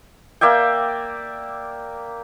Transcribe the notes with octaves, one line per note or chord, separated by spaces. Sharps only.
A#3 D5 E5 G5